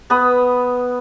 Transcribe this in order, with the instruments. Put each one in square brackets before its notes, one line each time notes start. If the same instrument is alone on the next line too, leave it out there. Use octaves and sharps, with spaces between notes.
[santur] B3 B5 D#6